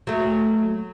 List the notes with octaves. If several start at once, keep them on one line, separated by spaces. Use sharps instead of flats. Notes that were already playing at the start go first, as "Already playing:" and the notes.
F#3 A3